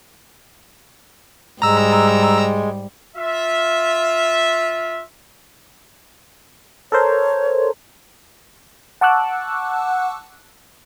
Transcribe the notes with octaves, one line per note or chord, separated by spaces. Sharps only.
G#2 G3 G#3 A#5 E6
F4 E5
A4 A#4 C5 C#5
F#5 A5 C#6 D6 E6 F#6